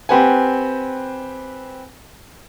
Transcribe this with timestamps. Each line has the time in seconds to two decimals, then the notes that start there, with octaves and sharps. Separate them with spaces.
0.09 C4 G4 B4 F#5 G#5